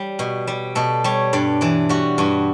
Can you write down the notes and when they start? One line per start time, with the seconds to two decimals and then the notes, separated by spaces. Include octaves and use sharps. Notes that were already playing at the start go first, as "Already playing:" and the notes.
Already playing: G3
0.19 B2
0.47 G3
0.75 B2 A4
1.04 G3 C#5
1.33 G2 D5
1.61 E3 D5
1.89 G3 F#4
2.18 G2 F#4